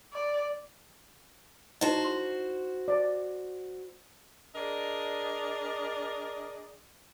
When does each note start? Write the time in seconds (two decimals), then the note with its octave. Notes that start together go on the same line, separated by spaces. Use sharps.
0.13 D5
1.81 D#4 E4 F#4 C5 D#5
2.05 C6
2.88 D5
4.55 D4 G#4 A#4 D5 D#5